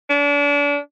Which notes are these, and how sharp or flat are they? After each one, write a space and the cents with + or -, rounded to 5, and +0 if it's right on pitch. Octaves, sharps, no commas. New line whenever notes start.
D4 -35